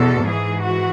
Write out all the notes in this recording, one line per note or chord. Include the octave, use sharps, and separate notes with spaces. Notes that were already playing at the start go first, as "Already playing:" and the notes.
Already playing: E2 B2 A4
G#2 E3 G#4
F#4